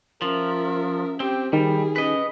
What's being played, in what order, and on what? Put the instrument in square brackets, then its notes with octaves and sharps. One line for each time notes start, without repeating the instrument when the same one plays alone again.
[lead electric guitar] F3 [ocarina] C#4 [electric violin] A#4 E5
[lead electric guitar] C4 [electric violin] G4
[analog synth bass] D#3 [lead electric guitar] G3 [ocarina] G4 [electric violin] G#4
[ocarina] C#4 [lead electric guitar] B4 D#5